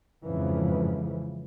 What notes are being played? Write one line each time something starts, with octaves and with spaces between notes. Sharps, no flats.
F2 G#2 C#3 E3 F3